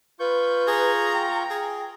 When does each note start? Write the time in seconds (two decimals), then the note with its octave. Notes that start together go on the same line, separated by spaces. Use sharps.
0.20 F4 B4 C#6 G6
0.68 G#4 A#5
1.14 G5
1.50 G#4